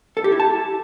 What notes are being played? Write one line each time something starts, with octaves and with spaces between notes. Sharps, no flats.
A4
G4
E4
A5